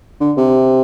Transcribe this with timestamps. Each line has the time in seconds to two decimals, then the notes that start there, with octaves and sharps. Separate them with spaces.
0.21 D3
0.37 C3